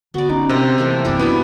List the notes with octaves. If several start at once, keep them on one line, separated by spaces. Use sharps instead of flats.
D3 B3 F#4 D5
C#4 D#4
C3 A#4 C5 D#5
E3 A3 A#3
F#2 C4 E4 G4 D5
B2 G3 B3 D4 E4